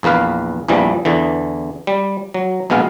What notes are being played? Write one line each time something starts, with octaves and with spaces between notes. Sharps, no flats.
A#1 E2 A#3 B4 F5
A#1 E2 E3 F3 G3
E2 D3 E3
G3
F#3
A#1 B2 G#3 B3 F5